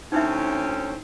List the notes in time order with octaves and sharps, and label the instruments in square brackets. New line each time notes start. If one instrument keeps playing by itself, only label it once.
[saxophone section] D2 C4 C#4 [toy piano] D#4 E4 E5